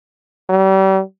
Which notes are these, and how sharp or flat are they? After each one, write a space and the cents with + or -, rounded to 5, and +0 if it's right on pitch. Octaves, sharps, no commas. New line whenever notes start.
G3 -35